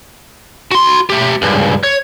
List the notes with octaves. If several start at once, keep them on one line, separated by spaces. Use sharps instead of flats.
F#4 C6
A3 G4
C#2 G2
C#5